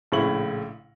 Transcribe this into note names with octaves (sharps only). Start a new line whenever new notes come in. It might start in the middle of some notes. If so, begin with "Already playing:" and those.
A#1 A2 C#3 E4 C#6 F#7